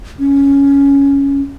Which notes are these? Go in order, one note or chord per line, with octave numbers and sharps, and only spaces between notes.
C#4